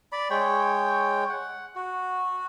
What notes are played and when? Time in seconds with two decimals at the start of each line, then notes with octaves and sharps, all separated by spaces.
0.12 D5 B5
0.30 G#3 C#5 G5
1.29 F#5
1.76 F#4